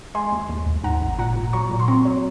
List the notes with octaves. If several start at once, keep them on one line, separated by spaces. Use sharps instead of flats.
G#3 G#5 C6
D#2
D#2
D#2
G#2 F#5 A#5
G#1
A#2 F#5 A#5
A#2
F#3 A#5 C#6
A#2
C6
C4 A#5 C#6
F#3